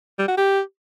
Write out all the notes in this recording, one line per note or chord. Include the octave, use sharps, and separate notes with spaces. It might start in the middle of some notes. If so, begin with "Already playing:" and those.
G3
F#4
G4